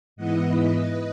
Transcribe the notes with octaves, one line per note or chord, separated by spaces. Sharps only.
G#2 E3 B3 E4 D#5 F#5
B4 D#5